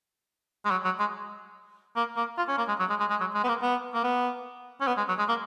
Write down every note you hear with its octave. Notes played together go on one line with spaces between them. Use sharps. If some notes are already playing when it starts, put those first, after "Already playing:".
G#3
F#3
F#3
G#3
A#3
A#3
F4
C#4
A#3
G#3
F#3
G#3
G#3
G#3
F#3
G#3
B3
A#3
B3
A#3
B3
C#4
B3
G#3
F#3
G#3
A#3